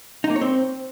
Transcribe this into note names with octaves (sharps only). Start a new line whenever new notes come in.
D#4
A#3
C#5
C4